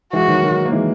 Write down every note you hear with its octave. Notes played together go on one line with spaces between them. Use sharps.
E3 G#3 F#4
D#3 F#3
D#3 F#3
A#3
E3 G#3